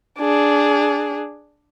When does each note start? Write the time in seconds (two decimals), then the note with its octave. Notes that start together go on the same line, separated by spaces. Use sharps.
0.19 D4 G#4